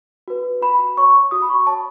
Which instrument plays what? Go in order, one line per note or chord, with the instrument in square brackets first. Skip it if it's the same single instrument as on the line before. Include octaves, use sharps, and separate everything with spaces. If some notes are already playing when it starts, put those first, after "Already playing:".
[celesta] F#4 B4
F#4 B5
C#5 C#6
F#4 D#6
B5
C#6
C#5 A5